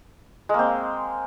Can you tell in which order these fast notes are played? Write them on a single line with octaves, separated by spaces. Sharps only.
G#3 A#3 C4